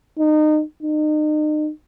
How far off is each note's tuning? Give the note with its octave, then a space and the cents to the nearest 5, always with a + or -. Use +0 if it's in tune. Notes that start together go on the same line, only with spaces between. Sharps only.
D#4 -25
D#4 -35